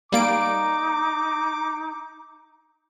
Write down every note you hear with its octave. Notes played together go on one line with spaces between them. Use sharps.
G3 A#3 D#4 D6 D7